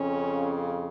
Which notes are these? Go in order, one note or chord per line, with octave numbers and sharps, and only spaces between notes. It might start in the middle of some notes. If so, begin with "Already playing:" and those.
Already playing: F2 C#3 C#4